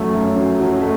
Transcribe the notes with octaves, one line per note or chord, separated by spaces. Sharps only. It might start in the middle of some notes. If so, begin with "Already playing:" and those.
Already playing: F#2 F#3 A3
F#2
F#2
F#3
A3